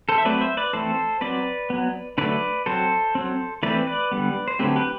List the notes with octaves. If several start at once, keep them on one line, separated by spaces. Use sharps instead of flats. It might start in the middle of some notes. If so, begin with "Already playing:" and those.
A4 C5
E5
F#3 A3 C4 B4 D5
C5 E5
B4 D5
E3 A3 C4 A4 C5
F#3 C4 B4 D5
F#3 B3
D3 F#3 A3 B4 D5
F#3 C4 A4 C5
F#3 C4
E3 A3 C4 B4 D5
B4 D5
D3 G3 B3
C5
D3 F#3 A3 C4 G4 B4
G4 B4